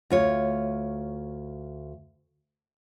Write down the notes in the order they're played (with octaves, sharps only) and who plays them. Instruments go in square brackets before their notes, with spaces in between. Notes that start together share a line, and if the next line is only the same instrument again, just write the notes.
[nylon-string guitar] D2 F4 C#5